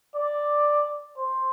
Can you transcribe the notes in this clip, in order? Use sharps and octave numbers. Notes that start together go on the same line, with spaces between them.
D5
C5